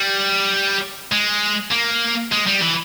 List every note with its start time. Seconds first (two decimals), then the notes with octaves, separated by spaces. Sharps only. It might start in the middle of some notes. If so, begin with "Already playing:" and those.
Already playing: G3
1.12 G#3
1.72 A#3
2.32 G#3
2.47 G3
2.62 E3